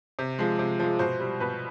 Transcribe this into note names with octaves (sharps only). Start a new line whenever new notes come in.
C3
F3 G#3
C3
F3 G#3
B2 C5
G3
B2 B4